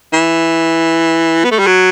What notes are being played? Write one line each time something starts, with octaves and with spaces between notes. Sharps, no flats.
E3
B3
A3
G3
F#3